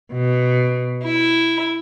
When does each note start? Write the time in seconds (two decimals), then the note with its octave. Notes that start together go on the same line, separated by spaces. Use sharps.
0.11 B2
1.03 E4